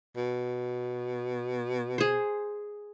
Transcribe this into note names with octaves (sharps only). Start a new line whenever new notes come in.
B2
G#4 C5